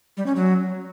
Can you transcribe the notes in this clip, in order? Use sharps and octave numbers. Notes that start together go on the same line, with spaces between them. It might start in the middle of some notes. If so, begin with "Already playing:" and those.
G3
C#4
F#3